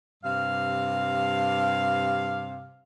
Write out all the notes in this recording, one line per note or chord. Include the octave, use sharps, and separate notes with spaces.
G2 C3 F5